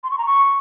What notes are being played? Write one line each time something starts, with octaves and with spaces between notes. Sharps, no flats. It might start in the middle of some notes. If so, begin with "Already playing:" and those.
C6
C#6
A#5
C#6